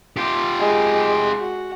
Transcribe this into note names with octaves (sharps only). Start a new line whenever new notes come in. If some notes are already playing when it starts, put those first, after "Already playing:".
F4 G4
G#3
F#4